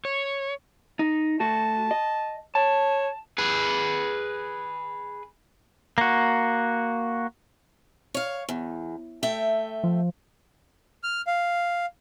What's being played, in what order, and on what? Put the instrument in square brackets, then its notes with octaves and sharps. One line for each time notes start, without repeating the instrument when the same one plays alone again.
[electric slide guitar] C#5
D#4
[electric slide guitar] A3 F#4 [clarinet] A5
[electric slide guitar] D#5
[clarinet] C#5 [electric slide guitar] A5
[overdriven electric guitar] G#4 B4
[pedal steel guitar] A#3 F#4
[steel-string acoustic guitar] C#5 F5
E2
A3 E5 G5
[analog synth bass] F3
[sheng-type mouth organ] F6
F5